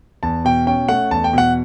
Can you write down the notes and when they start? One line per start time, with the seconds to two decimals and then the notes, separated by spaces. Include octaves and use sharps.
0.23 E2 A5
0.45 B2 G5
0.67 C#4 G5
0.89 A3 F#5
1.11 E2 A5
1.24 G5
1.33 B2 F#5